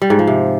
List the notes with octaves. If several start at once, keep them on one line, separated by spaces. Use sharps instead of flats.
G3
G#2
F3
C3